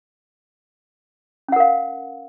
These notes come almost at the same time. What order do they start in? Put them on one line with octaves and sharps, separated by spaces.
C#4 F#5 A#4 F5